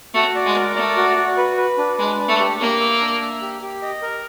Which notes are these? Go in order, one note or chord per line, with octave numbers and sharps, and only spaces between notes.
A3 F#4
D5
G#3
A#4
A3 D5
F#4
F#4
B4
B4
D4
G#3 B4
D4
A3
G4
A#3 G4
E5
D4
E5
G4
G4
D#5
A#4